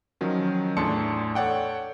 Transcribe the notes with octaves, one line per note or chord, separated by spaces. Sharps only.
D#3 F3 F#3 C#4
E2 A2 D4 A5 C6 C#7
A4 C#5 D5 F#5 G5